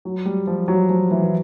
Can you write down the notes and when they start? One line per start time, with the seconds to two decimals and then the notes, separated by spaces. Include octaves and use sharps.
0.05 F#3
0.25 G3
0.47 F3
0.68 F#3
0.89 F3
1.11 E3
1.24 E3